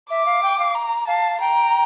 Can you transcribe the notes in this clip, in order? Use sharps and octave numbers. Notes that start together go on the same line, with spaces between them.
E5 D6
F5
G5
F5
A#5
F5 A5
G5 A#5